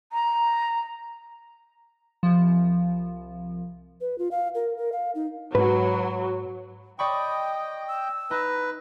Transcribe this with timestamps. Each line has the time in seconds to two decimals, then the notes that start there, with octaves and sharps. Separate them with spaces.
0.12 A#5
2.23 C2 F3
4.01 B4
4.18 F4
4.31 F5
4.55 A#4
4.77 A#4
4.92 F5
5.15 D#4
5.55 G#2 F#3 B4
6.99 D5 D#5 G5 B5 C#6 D#6
7.88 E6
8.31 D#4 B4 A#5